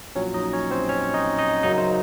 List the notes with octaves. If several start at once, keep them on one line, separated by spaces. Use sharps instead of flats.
A#1 A#2 F#3 C#4 C#5
D#4 D#5
C#4 C#5
C4 C5
C#4 C#5
D#4 D#5
D#4 D#5
F#2 C#3 F#3 D#4 D#5
C5